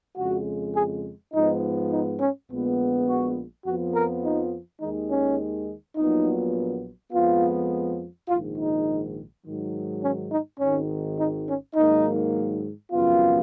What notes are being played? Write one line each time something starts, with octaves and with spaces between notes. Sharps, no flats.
F2 C#3 G#3 F#4
G#4
G#2 F3 B3 D#4
D#4
C#4
A#1 A#2 G#3 B3
F#4
F2 F3 B3 F#4
A#4
D#4
D#2 D#3 G#3 D#4
C#4
A#1 A#2 F#3 B3 D#4
F2 F3 G#3 B3 F4
A#1 G#2 D#3 F4
D#4
G#2 D#3 F#3
C#4
D#4
G#1 G#2 D#3 C#4
D#4
C#4
G#2 D#3 F#3 A#3 D#4
G#1 F#2 C#3 F3 B3 F4